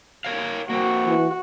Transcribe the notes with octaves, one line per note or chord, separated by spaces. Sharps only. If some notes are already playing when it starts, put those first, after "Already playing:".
A#4 C#5 F5
A#3 C4 F#4
E3